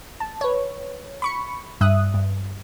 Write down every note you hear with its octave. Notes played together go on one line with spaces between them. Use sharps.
A5
B4 C#5
B5 C#6 C#7
G2 E5 D#6 F#6
G2